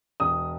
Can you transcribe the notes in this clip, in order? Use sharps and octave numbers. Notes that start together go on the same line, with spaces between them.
E1 D#6